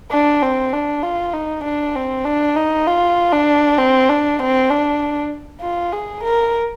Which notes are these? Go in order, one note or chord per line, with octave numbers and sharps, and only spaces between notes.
D4
C4
D4
F4
D#4
D4
C4
D4
D#4
F4
D4
C4
D4
C4
D4
F4
G#4
A#4